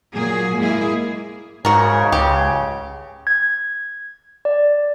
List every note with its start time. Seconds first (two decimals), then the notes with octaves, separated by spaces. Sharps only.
0.14 A#2 F#3 A#3 G#4
0.58 G#2 G#3 A#3 E4 G#4
1.65 G#2 C#3 F#4 A#4
2.12 C#2 G4
3.27 G#6
4.45 D5